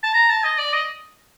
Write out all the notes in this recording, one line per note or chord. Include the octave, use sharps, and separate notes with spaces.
A5
A#5
A5
D#5
D5
D#5